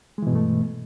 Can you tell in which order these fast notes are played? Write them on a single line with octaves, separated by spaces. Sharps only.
G#3 E3 B2 G2 A3